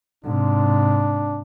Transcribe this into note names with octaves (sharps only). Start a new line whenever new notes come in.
G#2 C3 D4